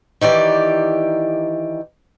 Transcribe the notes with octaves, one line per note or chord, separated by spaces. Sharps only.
D#3 E3 G4 D5